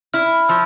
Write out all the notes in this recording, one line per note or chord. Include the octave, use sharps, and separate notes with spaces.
E4 F6
F3 E6